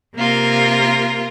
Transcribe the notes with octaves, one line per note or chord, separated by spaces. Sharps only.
C3 A#3 F4 A#4